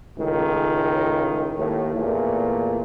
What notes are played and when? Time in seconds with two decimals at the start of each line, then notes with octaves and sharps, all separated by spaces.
0.18 C#2 A2 D#3
1.58 D#2 A2
1.95 E2 A#2 A3